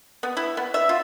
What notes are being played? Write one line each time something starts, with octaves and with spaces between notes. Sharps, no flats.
B3
E4
B3
E5
F4